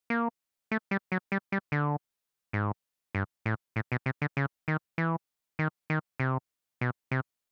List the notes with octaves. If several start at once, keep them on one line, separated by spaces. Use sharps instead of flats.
A#3
A3
G3
F#3
G3
G3
D3
G#2
G2
A2
A2
B2
C3
D3
C#3
D#3
E3
D#3
D#3
C3
B2
C3